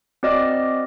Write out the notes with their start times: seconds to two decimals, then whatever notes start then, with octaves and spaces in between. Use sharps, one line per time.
0.23 C4 F#4 D5 D#5 F6